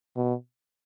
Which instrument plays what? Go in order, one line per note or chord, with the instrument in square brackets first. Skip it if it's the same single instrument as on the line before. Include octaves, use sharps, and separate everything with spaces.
[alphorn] B2